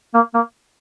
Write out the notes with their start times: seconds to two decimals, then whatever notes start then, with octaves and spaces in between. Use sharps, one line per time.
0.14 A#3
0.34 A#3